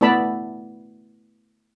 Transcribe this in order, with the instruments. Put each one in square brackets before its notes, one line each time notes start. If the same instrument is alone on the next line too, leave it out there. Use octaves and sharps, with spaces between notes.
[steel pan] A3 B3 E4 D5 A5 B5